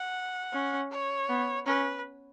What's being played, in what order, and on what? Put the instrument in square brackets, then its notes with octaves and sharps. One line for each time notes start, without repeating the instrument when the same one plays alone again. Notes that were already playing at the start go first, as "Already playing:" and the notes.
Already playing: [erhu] F#5
[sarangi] C#4
[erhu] C#5
[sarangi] B3
[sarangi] C#4 [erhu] B4